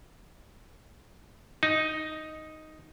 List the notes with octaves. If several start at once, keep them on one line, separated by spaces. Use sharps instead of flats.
D#4